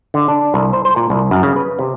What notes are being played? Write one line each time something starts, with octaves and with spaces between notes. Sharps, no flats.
D3
D4
C2
C5
C5
A#2
C2
F#2
C#3
B4
C3